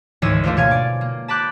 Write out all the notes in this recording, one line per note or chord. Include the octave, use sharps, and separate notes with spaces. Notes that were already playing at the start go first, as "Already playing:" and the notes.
G#1 D2 E3 C#5 D#5 E6
A3 A#3 D4 F4 A#4 C5
B2 C#5 F5 G#5
D5
A#3
A5 B5 D6 F#6 G6